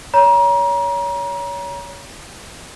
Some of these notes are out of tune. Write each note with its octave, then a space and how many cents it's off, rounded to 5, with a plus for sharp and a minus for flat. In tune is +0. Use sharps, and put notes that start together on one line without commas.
C#5 +25 A#5 +30